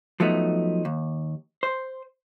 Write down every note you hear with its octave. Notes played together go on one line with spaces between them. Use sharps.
F3 F#3 A3 B3 D#4
D#2
C5